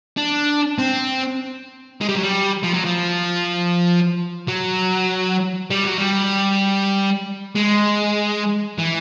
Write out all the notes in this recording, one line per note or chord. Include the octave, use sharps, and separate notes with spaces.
D4
C4
G#3
G3
F#3
G3
F3
F#3
F3
F#3
G3
F#3
G3
G#3
E3